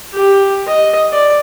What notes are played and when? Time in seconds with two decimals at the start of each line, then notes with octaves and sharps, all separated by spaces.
0.14 G4
0.67 D#5
1.12 D5